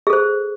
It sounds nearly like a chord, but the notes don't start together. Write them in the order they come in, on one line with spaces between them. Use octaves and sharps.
G#4 A4 C5